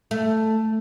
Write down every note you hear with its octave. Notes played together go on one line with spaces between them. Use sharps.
A3